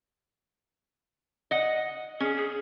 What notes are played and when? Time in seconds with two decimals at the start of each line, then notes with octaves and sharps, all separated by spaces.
1.51 D#5 F#5
2.20 C#4 G#4
2.36 G#4